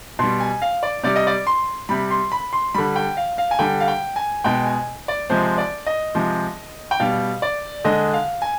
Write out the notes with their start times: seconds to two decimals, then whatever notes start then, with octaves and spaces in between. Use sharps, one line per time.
0.19 B2 G3 C6
0.40 G#5
0.62 F5
0.83 D5
1.04 C3 G3 D5
1.16 D#5
1.27 D5
1.47 C6
1.89 C3 G3 B5
2.11 C6
2.32 B5
2.53 C6
2.75 D3 G3 B5
2.96 G5
3.17 F5
3.38 F5
3.51 G#5
3.59 D3 G3 G5
3.80 F5
3.88 G5
4.16 G#5
4.44 B2 G#3 G5
4.66 G#5
5.08 D5
5.30 C3 F3 G#3 C5
5.58 D5
5.87 D#5
6.15 C3 F3 G#3
6.91 G5
7.00 B2 G3 F5
7.42 D5
7.85 D3 G#3 D#5
8.13 F5
8.42 G#5